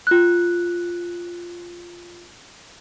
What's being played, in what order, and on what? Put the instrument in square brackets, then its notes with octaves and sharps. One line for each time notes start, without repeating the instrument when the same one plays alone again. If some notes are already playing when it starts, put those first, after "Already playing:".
[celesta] F4 F#6